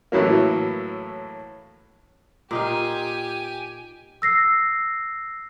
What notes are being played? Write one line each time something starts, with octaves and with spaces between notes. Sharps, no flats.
A2 E3 F#3 A#3
A#2 D#4 G4 F5 G#5
E6 A#6 C7